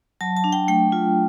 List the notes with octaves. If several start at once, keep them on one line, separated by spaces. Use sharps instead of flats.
F#3 A5
A5
D4
G5
A3 G5
F4